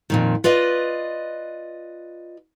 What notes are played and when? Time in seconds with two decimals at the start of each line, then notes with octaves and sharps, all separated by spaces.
0.10 F2 A#2 D#3
0.44 F4 B4 D5 D#5